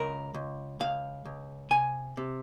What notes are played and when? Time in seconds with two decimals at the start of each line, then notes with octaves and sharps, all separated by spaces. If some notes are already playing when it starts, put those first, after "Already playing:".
Already playing: C#2 A#4
0.34 C#2
0.80 C#2 F5
1.25 C#2
1.70 C3 G#5
2.17 C3